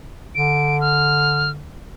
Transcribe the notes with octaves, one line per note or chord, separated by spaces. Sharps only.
D3 D7
F6